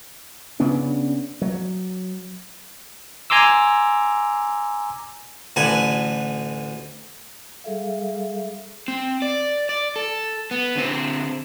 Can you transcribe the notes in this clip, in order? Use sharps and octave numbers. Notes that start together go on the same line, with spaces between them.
C#3 B3 C#4 D4
F#3
G#5 A#5 C6 D6 E6
A1 D2 D3 F#4 B4 G#5
G3 G#4 A4 E5 F5
C4
D5
D5
A4
B3
D3 C4